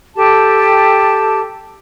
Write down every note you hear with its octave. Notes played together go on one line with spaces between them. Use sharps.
G4 A4 A5